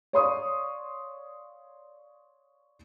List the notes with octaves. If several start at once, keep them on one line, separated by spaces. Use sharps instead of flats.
C#5 D5 F5 C6 C#6 D#6